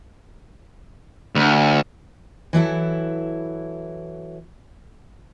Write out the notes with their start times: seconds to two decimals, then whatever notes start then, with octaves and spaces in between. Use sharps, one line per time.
1.35 D2
2.53 E3 F#3 E4 A4